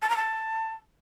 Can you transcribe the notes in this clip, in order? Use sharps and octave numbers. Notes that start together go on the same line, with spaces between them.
A5
A#5
A5